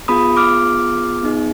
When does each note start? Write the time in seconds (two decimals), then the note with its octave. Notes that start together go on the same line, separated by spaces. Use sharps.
0.08 B3 F4 G#4 B5 D#6
0.37 D6 F6
1.23 B3 D#4 G#4